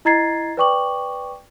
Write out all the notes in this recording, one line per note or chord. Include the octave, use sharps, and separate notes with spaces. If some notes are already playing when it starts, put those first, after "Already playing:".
E4 D#5 A#5 G#6 A6 C7
B4 D5 G5 C#6 D6 F#7